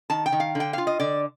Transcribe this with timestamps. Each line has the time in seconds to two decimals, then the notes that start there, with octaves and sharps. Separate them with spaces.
0.10 D#3 A5
0.26 G5
0.32 D#3
0.40 F5
0.55 D3
0.60 G5
0.73 F4 F5
0.87 D#5
1.00 D3 D5